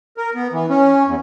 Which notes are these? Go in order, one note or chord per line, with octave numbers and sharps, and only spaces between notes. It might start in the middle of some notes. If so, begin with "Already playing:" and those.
A#4
B3
E3
C#4
E2